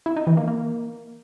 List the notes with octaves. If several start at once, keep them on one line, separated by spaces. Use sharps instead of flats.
E4
D#4
E3
A#3
A#3